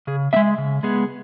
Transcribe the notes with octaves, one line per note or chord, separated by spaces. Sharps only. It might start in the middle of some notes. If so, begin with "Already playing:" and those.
C#3 G#4
B3 E5
G#3
C#3
G#3 B3 G#4